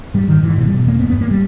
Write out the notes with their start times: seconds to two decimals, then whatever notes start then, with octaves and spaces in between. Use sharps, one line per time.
0.14 G#2 G3
0.28 G#2 D#3
0.43 G#2 E3
0.57 B2 E3
0.67 G3
0.71 B2
0.85 E2 A#3
0.99 G2 B3
1.10 B3
1.13 G2
1.21 A#3
1.31 G3